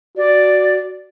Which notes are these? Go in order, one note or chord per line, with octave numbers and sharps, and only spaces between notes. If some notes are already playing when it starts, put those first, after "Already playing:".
F#4 D5